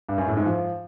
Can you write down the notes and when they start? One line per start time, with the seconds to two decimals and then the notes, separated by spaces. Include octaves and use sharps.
0.09 G2
0.18 F#2
0.27 A2
0.37 G#2
0.46 F3